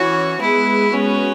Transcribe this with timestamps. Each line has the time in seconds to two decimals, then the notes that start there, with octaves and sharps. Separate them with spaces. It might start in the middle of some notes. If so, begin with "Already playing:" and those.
Already playing: E3 C#4 E4 F#4 C#5
0.41 G#3 B3 E4 G#4 B4
0.93 G#3 B3 C#4 F#4 B4